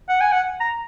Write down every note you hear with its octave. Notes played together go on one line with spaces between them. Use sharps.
F#5
G#5
F#5
A#5